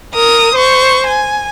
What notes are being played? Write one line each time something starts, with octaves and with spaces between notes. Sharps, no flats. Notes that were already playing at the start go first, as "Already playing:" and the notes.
A#4 D#6
C5 C#6
G#5